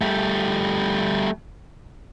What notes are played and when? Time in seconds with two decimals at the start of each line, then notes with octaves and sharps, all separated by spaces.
0.01 G3 A3